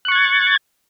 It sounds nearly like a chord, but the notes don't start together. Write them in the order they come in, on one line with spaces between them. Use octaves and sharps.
F#6 C#6 A6 G#6